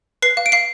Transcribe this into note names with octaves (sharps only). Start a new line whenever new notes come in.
B4 C7
F5
D7
F5 C7